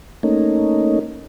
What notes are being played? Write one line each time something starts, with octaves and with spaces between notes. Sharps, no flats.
A3 A#3 C#4 D#4